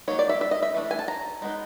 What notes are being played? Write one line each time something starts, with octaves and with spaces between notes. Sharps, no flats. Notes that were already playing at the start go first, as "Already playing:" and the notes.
F#3 A#3 D#4 C#5
D5
E5
E5
D#5
E5
E3 A3 D4
G#5
A5
A#5
G#3 B3 D#4